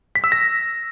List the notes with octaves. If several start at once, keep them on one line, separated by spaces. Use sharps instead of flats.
B6
E6
A#6